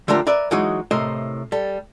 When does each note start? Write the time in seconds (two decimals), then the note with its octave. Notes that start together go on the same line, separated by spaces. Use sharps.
0.08 D3 F3 A3 D4 G4 A#4
0.27 A#4 B4 D5 E5
0.51 E3 F#3 G#3 D#4 F#4
0.91 A2 C3 A#4 C5 D#5
1.52 G3 A4